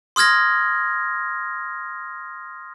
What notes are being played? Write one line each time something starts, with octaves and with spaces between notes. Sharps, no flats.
C6 D#6 F6 G#6 A#6